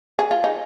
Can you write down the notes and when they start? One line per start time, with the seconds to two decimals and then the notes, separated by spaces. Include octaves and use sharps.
0.19 G#4
0.31 F4
0.44 D#4